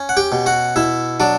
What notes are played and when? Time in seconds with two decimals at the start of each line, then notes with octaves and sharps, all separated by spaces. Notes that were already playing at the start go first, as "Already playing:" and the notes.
Already playing: C#4
0.09 F#5
0.17 G4 G5
0.32 B2
0.46 F#4 F#5
0.76 B2 E4 E5
1.20 F#3 D4 D5